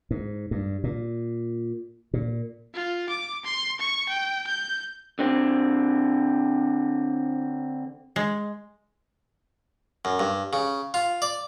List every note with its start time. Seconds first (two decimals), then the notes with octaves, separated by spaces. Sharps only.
0.11 G#2
0.51 G2
0.84 A#2
2.14 A#2
2.74 F4
3.09 D6
3.45 C6
3.80 C#6
4.09 G5
4.47 G6
5.19 D3 C4
8.16 G#3
10.05 F#2
10.19 G2
10.53 C#3
10.94 F4
11.22 D5